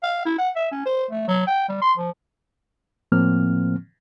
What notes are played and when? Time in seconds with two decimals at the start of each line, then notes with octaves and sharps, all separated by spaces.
0.03 F5
0.25 E4
0.38 F#5
0.56 E5
0.71 C#4
0.85 C5
1.11 A3
1.27 F#3
1.47 G5
1.68 G3
1.81 C6
1.97 F3
3.12 A2 F3 A#3 C4 F6